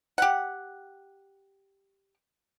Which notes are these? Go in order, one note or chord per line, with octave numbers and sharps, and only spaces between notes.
G4 F#5